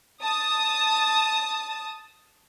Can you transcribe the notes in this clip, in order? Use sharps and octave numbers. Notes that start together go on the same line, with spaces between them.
A5 D#6